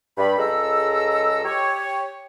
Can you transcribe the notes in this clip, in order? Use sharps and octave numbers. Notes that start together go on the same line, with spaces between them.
G2 B5
C#2 G#3 A4 A#5 E6
G4 C#5